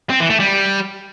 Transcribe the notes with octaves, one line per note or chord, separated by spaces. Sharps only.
C4
E3
A3
G3